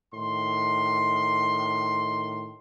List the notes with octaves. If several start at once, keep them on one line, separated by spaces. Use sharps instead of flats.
A2 D#3 C6